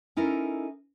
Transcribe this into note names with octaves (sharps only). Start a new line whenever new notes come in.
C#4 D#4 E4 A4 A#4